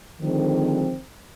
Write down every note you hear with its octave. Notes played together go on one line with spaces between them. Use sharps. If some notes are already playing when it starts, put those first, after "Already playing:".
D3 D#3 F3 G#3 C4